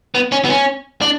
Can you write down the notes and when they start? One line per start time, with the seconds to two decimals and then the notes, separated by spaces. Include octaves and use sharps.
0.15 B3
0.32 C#4
0.45 B3
0.49 C#4
1.01 D4